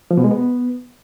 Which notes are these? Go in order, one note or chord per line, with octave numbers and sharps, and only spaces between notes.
F3
B2
G#3
B3